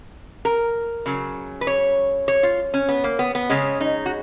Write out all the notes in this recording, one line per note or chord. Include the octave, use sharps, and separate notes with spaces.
A#4
C#3 F#3
B4
C#5
C#5
F4
C#4
B3
A#3
B3
B3
C#3 G#3 C#4
D#4
F#4